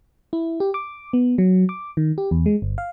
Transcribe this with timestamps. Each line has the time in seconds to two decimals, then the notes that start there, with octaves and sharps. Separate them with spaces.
0.33 E4
0.60 G4
0.74 D6
1.13 B3
1.38 F#3
1.69 D6
1.97 D#3
2.18 G4
2.31 E2
2.46 G#3
2.62 G1
2.78 F5